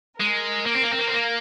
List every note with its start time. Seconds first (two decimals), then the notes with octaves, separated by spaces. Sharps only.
0.19 G#3 A#4
0.66 A#3
0.75 C4
0.83 A#3
0.92 C4
0.99 A#3
1.08 C4
1.14 A#3